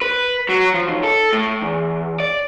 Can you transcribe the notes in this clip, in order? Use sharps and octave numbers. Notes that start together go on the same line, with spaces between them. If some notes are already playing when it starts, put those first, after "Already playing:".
B4
F#3
F3
B1
A4
A2
E2
D5